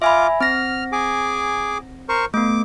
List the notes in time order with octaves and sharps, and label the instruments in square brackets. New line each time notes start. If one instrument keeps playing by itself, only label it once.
[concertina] F4 D6 [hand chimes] E5 G#5 B5
[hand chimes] C4 A#6 [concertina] F6
[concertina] G#4 G#5 D6
A#4 C5 C#6
[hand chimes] A3 B3 [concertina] D6